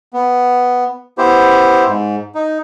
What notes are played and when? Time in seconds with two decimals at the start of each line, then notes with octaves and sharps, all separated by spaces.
0.13 B3
1.18 B3 E4 G4 C5
1.86 G#2
2.35 D#4